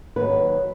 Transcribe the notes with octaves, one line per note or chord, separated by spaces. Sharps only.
D#2 D#3 F#3 B4